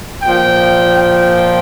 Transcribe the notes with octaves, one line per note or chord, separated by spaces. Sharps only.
A#2 F3 G5
G5